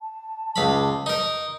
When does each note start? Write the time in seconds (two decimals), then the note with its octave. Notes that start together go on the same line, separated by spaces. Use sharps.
0.01 A5
0.56 C#2 F5 B5
1.06 D#4 A#4